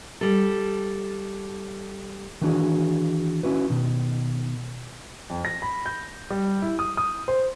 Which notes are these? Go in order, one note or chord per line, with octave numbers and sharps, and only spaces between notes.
G3 A4
D#3 E3 D4 F#4 G#4
C#4 E4 F#4 B4
B2 D#3
F2
A#6
B5
G6
G3
E4
D#6
D#6
C5